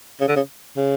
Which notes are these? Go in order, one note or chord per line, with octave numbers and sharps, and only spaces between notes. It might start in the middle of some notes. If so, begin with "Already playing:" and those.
C#3
D3
C#3
C#3